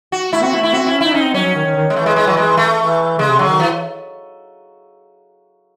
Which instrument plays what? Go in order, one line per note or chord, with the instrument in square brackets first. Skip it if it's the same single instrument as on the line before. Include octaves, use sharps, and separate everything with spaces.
[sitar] F#4
[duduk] A3 [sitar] E4
[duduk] C4 [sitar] F#4
[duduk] A3 [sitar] E4
[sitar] E4
[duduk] C4 [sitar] F#4
[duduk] C4 [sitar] E4
[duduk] C#4
[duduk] D#4 [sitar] E4
[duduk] C#4 [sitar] D#4
[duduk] C4
[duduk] F#3 [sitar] C#4
[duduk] F#3
D#3
D#3
D#3
[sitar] G#3
[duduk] E3 [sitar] A3
[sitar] G#3
G#3
F#3
G#3
A3
[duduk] E3
[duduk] C#3 [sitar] G#3
[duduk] C3
[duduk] C#3 [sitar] F#3
[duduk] D#3
[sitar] E3